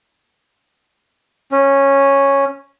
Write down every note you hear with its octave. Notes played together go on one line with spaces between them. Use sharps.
C#4